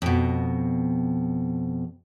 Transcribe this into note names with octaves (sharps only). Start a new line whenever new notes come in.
F2 B2